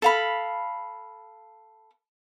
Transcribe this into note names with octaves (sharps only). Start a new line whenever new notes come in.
A4 F5 B5